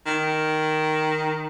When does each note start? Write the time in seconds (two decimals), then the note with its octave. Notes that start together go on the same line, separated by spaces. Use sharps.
0.06 D#3